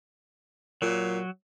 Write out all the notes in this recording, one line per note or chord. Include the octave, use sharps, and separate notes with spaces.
A#2 F#3